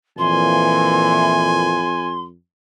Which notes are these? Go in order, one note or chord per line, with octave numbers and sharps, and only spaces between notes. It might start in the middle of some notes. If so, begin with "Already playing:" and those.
F2 A#2 E3 A#3 G#5 C6